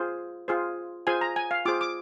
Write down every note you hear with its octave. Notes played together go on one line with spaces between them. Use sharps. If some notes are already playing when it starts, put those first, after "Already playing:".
Already playing: F4 G#4 C5
F4 G#4 C5
F4 G#4 C5 G#5
A#5
G#5
F5
F4 G#4 C5 D6
D6